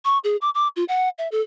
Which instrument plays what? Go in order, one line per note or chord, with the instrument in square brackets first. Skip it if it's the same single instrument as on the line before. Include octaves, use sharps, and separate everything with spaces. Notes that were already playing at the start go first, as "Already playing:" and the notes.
[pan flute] C#6
G#4
D6
D6
F4
F#5
E5
A4